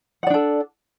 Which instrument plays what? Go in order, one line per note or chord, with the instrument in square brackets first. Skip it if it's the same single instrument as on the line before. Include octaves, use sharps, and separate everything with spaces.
[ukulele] F#5
D5
D4
A4